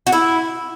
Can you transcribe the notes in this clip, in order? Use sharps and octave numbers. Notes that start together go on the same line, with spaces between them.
F#4
E4